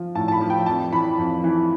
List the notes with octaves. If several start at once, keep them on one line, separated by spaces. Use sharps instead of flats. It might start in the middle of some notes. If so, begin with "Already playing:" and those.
Already playing: F3
A2 A5
A5
B5
F3
G5
F2 A5
E3 B5
F2
E3